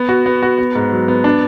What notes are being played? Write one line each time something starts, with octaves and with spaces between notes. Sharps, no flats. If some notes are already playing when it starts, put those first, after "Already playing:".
Already playing: B3
F#4
B3
F#4
B3
G#2
F#3
B3
D4